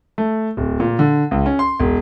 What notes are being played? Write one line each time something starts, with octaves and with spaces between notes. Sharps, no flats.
A3
D1
A#2
D3
C#2
C#4
C6
E1